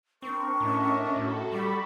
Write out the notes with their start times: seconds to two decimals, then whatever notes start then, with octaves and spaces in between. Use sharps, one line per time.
0.22 C4 D4 A#4 C#6
0.60 A2 C#4 D#5 E5
1.16 A2 F#4 A4
1.52 G3 D5 B5 C#6